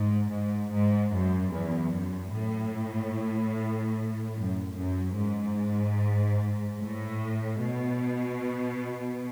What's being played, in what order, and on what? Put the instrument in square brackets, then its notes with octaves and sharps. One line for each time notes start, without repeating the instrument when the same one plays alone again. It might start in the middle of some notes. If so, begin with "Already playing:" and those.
Already playing: [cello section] G#2
G#2
G#2
F#2
E2
F#2
A2
F#2
F#2
G#2
A2
B2